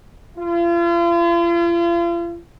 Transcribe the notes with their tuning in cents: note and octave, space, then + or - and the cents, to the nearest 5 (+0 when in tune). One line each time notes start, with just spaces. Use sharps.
F4 -40